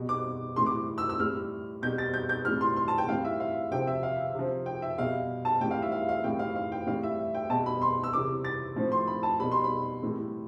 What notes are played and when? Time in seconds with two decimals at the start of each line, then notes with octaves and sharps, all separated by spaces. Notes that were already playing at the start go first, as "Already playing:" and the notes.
Already playing: B2 G3
0.09 D6
0.56 A2 E3 G3 C6
0.66 D6
0.98 E6
1.09 E6
1.20 A2 G3 F6
1.82 B2 G6
1.86 G3
1.98 A6
2.14 G6
2.29 G6
2.45 A2 E3 G3 F6
2.61 C6
2.76 C6
2.88 A5
2.98 G5
3.08 A2 E3 G3 F5
3.25 E5
3.40 F5
3.72 C3 F3 G5
3.87 E5
4.03 F5
4.35 C3 F3
4.66 G5
4.82 E5
4.98 B2 G3 F5
5.45 A5
5.61 A2 E3 G3 G5
5.71 F5
5.82 E5
5.92 F5
6.09 F5
6.24 A2 E3 G3 G5
6.39 F5
6.55 F5
6.72 G5
6.86 A2 E3 G3 F5
7.03 E5
7.34 G5
7.50 B2 A5
7.53 G3
7.66 B5
7.82 C6
8.04 E6
8.13 C3 E3 G3 D6
8.45 A6
8.76 A2 F3
8.92 C6
9.07 B5
9.23 A5
9.40 B2 G3 B5
9.52 C6
9.64 B5
10.03 A2 E3 G3